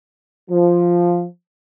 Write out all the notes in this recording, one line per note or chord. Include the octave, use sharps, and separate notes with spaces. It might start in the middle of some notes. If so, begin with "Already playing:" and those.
F3